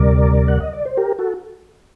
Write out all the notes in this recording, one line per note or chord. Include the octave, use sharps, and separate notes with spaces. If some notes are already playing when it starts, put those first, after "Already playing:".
Already playing: D2 C3 G3 A#4 D5
F#5
D#5
D5
C5
G4 A#4
F#4 A4